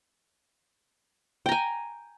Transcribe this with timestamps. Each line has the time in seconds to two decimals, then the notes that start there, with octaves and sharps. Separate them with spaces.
1.46 G5
1.49 A#5
1.52 G#5